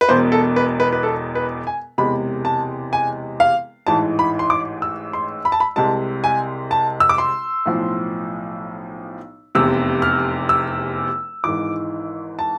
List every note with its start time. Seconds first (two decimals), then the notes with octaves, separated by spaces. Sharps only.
0.01 B4
0.08 E1 E2 B2 C5
0.32 A4
0.56 B4
0.80 B4
0.93 B4
1.03 A4
1.35 B4
1.67 G#5
1.98 E1 E2 C3 G#3 B5
2.45 A5
2.93 G#5
3.40 F5
3.87 A1 G#2 E3 A5
4.19 B5
4.39 C6
4.50 D6
4.82 E6
5.13 C6
5.45 B5
5.52 A5
5.60 B5
5.76 C2 C3 G#3 A5
6.24 G#5
6.71 A5
7.00 E6
7.09 D6
7.18 C6
7.66 B1 A2 F3
9.55 F1 E2 C3 E6
10.02 F6
10.49 E6
11.44 G#1 G#2 E3 D6
12.39 A5